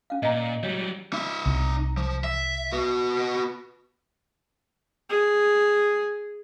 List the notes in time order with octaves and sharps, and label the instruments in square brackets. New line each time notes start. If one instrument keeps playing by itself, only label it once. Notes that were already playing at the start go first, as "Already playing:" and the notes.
[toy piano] C#4 F5
[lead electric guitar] A#2 [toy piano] D#5 A#5
[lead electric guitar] F#3 G3 [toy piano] C#5
[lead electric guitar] D#4 E5
[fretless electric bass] C2
[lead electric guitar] F3
E5
B3 F#4
[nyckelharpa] G#4